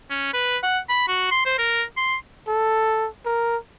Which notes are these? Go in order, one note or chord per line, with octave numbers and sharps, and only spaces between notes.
C#4
B4
F#5
B5
F#4
C6
C5
A#4
C6
A4
A#4